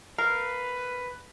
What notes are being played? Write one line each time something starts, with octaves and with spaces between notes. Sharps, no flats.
A#4 B4 F5